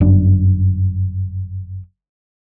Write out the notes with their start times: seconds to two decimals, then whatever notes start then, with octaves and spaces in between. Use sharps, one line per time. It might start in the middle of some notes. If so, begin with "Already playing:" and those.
0.01 G1 F#2 D4